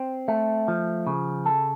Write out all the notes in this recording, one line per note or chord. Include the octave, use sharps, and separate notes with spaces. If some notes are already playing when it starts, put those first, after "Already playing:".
Already playing: C4
A3
F3
C#3
A4